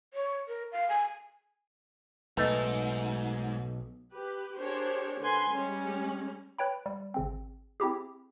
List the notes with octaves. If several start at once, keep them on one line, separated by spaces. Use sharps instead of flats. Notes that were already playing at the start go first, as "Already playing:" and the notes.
C#5
A#4
F5
G#5
B1 G#2 A3 B4 D#5 E6
G4 B4
D4 G4 G#4 A#4 C5 C#5
D3 B4 G#5 C6
G3 G#3 C#4
B4 C#5 G5 B5
G3
G#1 C#3 C4
C4 E4 G4 G#4